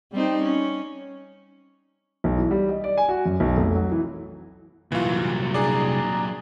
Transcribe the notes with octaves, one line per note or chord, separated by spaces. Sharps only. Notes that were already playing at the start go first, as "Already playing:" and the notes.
G3 C4 D#4
C#4
B1
E3
G3
D#5
D5
G#5
F#4
F#2
B1
F1
F#3
E3
C2 A#2 E3 F#3 F4 F#4
D4 G#4 D5 A#5